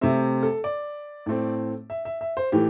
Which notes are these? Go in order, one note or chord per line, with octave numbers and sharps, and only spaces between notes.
C3 A3 C4 E5
A4
D5
A2 A3 C4
E5
E5
E5
C5
A2 E3 A3 G4